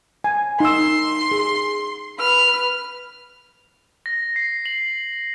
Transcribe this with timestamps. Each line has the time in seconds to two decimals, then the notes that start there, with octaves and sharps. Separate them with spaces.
0.24 G#5
0.60 D#4 C6 E6
1.31 G#4
2.19 B4 F6
4.06 A#6
4.36 C7
4.66 F#7